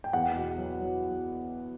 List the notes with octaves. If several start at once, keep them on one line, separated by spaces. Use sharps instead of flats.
G5
E2 F#5
B2
F#3
F#3